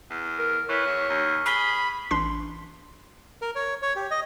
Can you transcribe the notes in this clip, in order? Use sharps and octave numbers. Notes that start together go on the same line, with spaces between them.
E2
A#4
E3 C#5 C#6 F6 B6
E2
D#2
G#4 B5 D#6 G7
A1 D4 C6 C7
A#4
C#5
C#5
G4
D#5